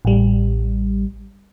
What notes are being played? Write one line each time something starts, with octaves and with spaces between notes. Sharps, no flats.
A1 G3